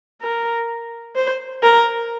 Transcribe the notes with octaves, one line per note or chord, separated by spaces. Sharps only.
A#4
C5
A#4